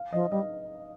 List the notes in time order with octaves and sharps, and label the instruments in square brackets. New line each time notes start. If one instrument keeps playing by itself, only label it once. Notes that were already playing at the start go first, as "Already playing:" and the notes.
Already playing: [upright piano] F5
[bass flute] F3 [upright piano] D#5
[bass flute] G3 [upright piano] D#5